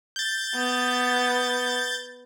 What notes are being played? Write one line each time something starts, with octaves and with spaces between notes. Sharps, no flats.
G6 A6
B3